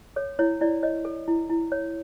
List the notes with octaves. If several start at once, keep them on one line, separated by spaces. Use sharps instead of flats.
A4 C#5
E4 C#5
E4 D5
C#5 D#5
A4
E4
E4
C#5